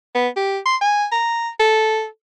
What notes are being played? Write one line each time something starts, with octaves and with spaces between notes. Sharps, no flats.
B3
G4
C6
G#5
A#5
A4